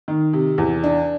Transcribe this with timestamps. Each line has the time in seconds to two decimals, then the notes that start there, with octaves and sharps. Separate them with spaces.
0.08 D#3
0.33 C3
0.58 E2
0.84 D4